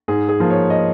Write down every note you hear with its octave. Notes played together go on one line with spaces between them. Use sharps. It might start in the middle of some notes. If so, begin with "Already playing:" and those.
G#2 G#4
G#4
F3 A#3
C#5
D#5